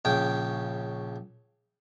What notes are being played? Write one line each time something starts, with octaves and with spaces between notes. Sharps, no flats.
A#1 C#3 G5